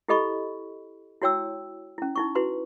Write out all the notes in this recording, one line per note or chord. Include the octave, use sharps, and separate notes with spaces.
E4 G4 A4 D#5 B5 C#6
E4 F#4 C#5 G5 E6
C#4 E4
D#4 E4 C#6
E4 F#4 B4 C6